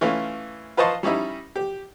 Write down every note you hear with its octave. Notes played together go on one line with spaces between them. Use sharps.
E3 A3 C#4 F4
F4 B4 C5 D#5 A5 C#6
G3 C#4 D#4 E4
G4